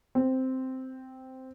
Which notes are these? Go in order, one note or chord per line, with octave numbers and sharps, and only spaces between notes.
C4